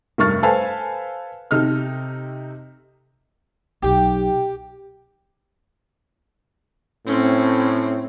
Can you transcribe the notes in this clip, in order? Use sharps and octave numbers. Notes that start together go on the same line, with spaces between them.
F1 G2 A#4 C#6 F6 A6
A4 B4 C5 F5 G#5 A5
C3 D#4 A4 F6
B1 G4
A2 C4 C#4